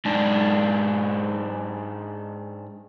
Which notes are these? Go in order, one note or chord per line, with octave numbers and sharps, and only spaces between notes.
G#2 D4